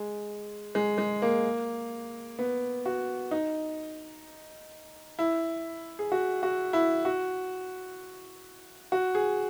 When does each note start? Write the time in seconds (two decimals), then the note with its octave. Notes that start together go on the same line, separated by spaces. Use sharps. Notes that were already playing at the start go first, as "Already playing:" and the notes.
Already playing: G#3
0.75 G#3
0.98 G#3
1.22 A#3
2.39 B3
2.86 F#4
3.31 D#4
5.19 E4
5.99 G#4
6.12 F#4
6.43 F#4
6.73 E4
7.05 F#4
8.92 F#4
9.15 G#4